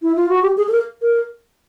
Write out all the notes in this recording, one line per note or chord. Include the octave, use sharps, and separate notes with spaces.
E4
F4
F#4
G4
G#4
A4
A#4
A#4